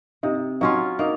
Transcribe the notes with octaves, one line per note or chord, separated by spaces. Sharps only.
C3 D#4
F#3 C#4 D#4 F4
A#3 D#4